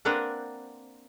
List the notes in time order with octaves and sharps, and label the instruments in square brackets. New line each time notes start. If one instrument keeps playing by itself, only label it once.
[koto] A#3 C4 D4 A#4 B4 F#5